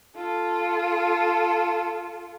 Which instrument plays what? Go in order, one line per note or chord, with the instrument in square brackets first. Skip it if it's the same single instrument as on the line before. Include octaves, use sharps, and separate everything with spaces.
[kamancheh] F4 A4